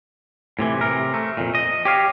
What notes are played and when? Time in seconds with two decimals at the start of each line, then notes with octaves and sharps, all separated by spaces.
0.59 A2 C3 E3
0.81 C3 A#4
1.14 A3
1.37 F2 A#2
1.55 D#5
1.85 G4 C#5 F5